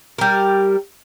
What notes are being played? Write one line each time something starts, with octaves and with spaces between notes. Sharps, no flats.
G3 A#4